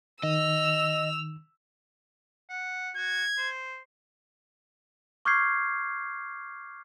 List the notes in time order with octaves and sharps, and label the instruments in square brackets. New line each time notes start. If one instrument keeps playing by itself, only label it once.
[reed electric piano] D#3 [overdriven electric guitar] D#5 [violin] E6 F7
[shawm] F#5
[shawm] F#4 [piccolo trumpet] G#6
[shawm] C5
[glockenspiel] C#6 D6 F6 G6 G#6 C7